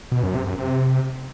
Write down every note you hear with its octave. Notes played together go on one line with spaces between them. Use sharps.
B2
F#2
C3
F#2
C3